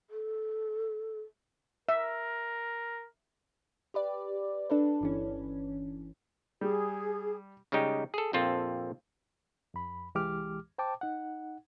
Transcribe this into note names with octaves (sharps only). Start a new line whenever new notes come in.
A4
A#4 E5
G4 B4 D5
D4 A4 B4
G1 E3 C#4
G3 G#4
C#3 G3 G#3 D#4 G4
G#4 A4
A#1 F2 C4 F4 A4
F2 B5
C2 E3 G#3 G4 D6 F6
C5 G5 A5 D6
D#4 F#5